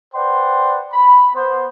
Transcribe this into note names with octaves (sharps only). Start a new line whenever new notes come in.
B4 C5 D5 F#5 G5 C6
B5
B3 C5